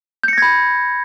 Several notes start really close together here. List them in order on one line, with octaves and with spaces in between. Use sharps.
G6 C#7 A#6 G#6 B5